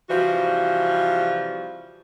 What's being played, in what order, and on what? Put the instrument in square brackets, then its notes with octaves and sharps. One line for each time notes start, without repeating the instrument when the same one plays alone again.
[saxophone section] C3 E3 F3 G3 F#4